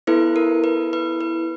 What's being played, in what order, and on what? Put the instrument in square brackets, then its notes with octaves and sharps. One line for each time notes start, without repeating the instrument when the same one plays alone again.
[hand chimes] B3 E4 A4 B4
A#4
B4
B4
B4